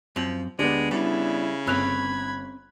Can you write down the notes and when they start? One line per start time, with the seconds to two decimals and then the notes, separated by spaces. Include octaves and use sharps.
0.16 F#2 F3 C4
0.59 D2 G#3 B3 D4 G4
0.91 C#3 G3 E4
1.67 G1 C4 C#4 B5 F#6 G#6 F7